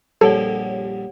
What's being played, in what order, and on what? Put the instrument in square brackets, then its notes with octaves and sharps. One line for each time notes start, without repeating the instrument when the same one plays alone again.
[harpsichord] A#1 F2 G3 [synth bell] G4 C#5 F#5 [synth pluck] A4